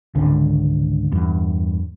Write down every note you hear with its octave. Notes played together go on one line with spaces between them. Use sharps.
G#1 C#2 D3
E2 G2